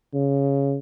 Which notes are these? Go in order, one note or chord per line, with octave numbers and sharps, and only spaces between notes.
C#3